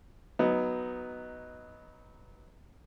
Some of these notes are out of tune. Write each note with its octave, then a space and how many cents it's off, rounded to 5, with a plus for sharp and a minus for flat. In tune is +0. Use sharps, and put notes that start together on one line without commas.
F#3 +0 B3 +0 D#4 +0